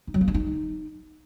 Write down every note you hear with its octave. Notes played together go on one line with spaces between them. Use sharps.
D#4
F#3
A#3
D4
D#4